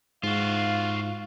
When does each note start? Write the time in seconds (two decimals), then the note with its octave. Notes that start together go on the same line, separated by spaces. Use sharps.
0.23 G#2 F4 F#4 F5